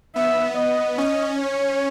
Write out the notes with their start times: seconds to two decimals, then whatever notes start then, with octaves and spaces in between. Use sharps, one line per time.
0.16 B3 E5
0.58 D#5
0.98 C#4 D#5
1.40 C#5